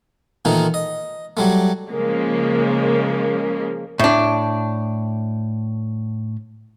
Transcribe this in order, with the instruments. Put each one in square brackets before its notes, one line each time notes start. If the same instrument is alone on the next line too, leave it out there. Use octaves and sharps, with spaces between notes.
[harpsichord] A#2 D#3 E3 A3 D#4
D#5
F#3 G3 A3
[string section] C#3 F3 G#3 A#3
[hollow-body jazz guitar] A2 D4